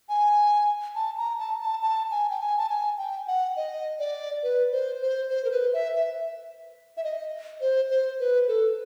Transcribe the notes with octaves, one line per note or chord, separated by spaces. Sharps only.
G#5
A5
A#5
A5
A5
A5
G#5
G5
G#5
A5
G#5
G5
F#5
D#5
D5
B4
C5
C5
C5
A#4
B4
E5
E5
E5
D#5
C5
C5
B4
A4